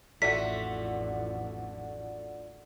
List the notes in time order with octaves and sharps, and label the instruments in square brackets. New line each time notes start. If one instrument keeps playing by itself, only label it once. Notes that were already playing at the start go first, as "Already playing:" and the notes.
[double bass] A1 F2 [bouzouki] D3 F4 E5 [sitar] A3 F#4 [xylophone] B6